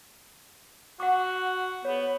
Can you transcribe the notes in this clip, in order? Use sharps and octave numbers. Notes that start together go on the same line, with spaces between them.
F#4 F#5 D6
B3 G#4 C#5